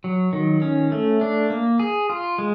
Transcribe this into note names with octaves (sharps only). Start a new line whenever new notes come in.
F#3
D#3
C#4
A3
D4
A#3
G#4
F4
G#3